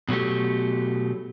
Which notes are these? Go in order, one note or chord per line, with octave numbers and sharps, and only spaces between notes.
B2 F#3 A3 G4